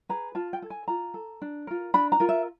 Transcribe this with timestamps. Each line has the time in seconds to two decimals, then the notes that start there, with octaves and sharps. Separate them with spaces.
0.09 G#4 B4 A#5
0.35 F4 A5
0.53 G5
0.62 A4
0.70 G#5
0.88 F4 A#5
1.14 A4
1.42 D4
1.67 F4 A#4
1.94 D4 B5
2.12 A#5
2.20 F4 A#4
2.29 E5